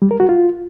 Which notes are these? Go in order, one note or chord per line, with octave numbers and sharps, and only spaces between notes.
G3
A#4
F#4
F4